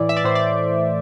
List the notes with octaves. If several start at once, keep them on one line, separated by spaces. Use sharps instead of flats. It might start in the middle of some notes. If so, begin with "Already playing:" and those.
Already playing: A2 E3 D5
E5
D5
A2 C5
D5